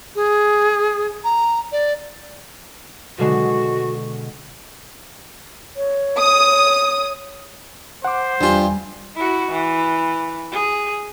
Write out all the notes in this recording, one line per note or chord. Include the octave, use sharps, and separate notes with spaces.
G#4
A#5
D5
B2 D3 G#3 F#4
C#5
D#6
C5 F#5 D6
E2 G2 G3 F4 G4 G#5
E4 F#4
E3
G#4